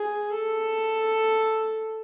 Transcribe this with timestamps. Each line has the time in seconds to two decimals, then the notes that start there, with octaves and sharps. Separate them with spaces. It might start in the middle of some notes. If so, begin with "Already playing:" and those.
Already playing: G#4
0.33 A4